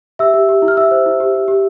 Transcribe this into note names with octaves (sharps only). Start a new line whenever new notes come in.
G4 E5 E6
G4
G4
E4
F6
E4 E5 E6
C5
E4
G4
G4
G4